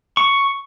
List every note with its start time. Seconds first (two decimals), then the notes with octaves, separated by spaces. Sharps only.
0.17 C#6